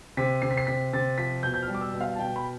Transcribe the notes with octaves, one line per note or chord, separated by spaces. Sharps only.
C3 B6
C3 C7
B6
C7
C3 B6
C3 A6
F3 B6
B2 G6
G6
F6
G3
D6
E6
B2
F5
A5
B2 G5
B5